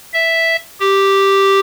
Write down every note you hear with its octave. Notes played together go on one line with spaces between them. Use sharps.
E5
G4